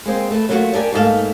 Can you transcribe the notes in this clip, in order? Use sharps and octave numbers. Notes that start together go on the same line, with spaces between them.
G#3 A#3 C4
A3 B4
F#3 A3 A#3 D#4 F4 F#4
D4 G4 A#4 D5 G#5
G#2 A3 A#3 E4 A4 F5